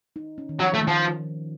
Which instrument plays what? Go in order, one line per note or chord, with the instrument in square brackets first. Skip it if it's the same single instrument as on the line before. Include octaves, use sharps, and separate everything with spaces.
[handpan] D#4
C#4
D#3
[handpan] F3 [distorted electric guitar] F#3
[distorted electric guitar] A3
[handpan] D#3
[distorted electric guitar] F3